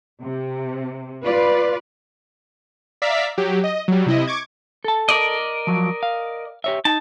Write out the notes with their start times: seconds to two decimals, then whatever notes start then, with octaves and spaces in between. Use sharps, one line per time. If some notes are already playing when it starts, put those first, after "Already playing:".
0.22 C3
1.24 F4 B4 D5
3.02 D5 E5 F5 A#5 B6
3.38 F#3 G4
3.64 D#5
3.88 F#3 G3
4.06 C3 E4 D#5
4.27 C#6 D6 G#6
4.84 A4 A5
5.09 A#4 D5 D#5
5.67 F3 F#3
6.03 F5
6.64 G4 C#5 E5
6.85 D#4 A5